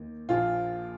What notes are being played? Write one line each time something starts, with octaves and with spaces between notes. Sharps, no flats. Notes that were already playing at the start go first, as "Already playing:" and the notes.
Already playing: D#2 D#3
A#1 A#2 F3 F4